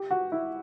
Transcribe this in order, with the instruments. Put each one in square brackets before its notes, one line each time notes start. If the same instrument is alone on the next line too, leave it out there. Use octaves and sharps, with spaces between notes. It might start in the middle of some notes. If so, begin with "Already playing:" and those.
Already playing: [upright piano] G4
F#4
E4